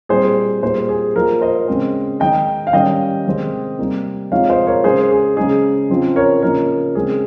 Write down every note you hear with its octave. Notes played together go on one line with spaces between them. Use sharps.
A#2 G3 C4 D#4 G#4 C5
A#2 G3 A#3 D#4 G#4 C5
G#4
F3 A#3 D#4 A#4
C5 D#5
C#3 G#3 C4
D#3 G#3 D#4 D#5 G5
F5
D#3 G3 C#4 D#5 G5
C3 D#3 G#3 C4
C3 G3 A#3 D#4
C3 F3 G#3 D#4 C#5 F5
C5 D#5
A#4 C#5
C#3 G#3 D#4 G#4 C5
G#4
C#3 G#3 D#4 G#4
C#3 F3 C4 D#4
A#4 C#5
C#3 F3 A#3 D#4 A#4
C#3 G#3 C4 G#4